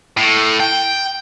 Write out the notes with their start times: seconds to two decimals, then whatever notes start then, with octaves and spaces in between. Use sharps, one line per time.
0.17 A2
0.60 G5